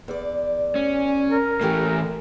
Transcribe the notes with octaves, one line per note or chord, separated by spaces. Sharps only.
E2 D5
C#4
A#4
A2 E3 A3 C#4 G4